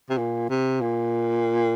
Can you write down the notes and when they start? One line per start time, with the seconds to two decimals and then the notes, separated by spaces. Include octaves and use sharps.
0.10 C3
0.18 A#2
0.50 C3
0.82 A#2